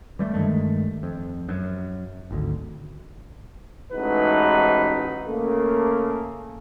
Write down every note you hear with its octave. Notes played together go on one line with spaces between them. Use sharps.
E3 G3 A3
G2 D#3 G#3 A3
F2
F#2
G#1 D2
A1 G#2 D#4 F#4 B4
C#3 A3 A#3